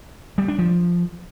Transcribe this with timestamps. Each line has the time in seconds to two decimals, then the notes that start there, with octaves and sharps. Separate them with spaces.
0.38 G3
0.48 D4
0.59 F3